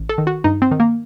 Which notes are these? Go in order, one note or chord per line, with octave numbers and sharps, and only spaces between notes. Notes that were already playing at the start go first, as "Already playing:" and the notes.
Already playing: A1
A4
D#3
F#4
G2 D#4
C4
D#3
A#3